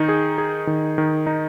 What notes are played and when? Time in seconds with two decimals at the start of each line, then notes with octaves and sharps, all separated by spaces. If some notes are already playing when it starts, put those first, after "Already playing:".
Already playing: D#3 D#4
0.09 G#4
0.38 G#4
0.67 D#3
0.98 D#3
1.27 D#4